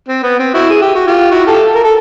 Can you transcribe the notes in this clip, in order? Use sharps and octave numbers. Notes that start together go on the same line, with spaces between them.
C4
B3
C4
E4 F#4
G#4
G4
F#4
F4 G4
E4 F#4
G4 A4
A#4
A4